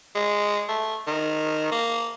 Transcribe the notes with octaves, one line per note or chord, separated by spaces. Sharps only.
G#3
A3
D#3
A#3